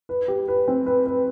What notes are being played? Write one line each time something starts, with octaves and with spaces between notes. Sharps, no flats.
B4
G4
B4
C4
B4
B4